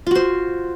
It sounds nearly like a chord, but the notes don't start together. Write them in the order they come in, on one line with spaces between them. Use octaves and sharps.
F4 F#4 C5